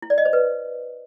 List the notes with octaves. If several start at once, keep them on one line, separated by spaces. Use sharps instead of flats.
E4
D5
D#5
C5
B4